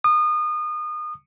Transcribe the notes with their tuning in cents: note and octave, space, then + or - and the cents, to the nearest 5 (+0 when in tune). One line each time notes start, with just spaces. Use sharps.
D#6 -30